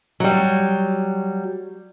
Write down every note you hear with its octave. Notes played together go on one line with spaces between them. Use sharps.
F#3 G3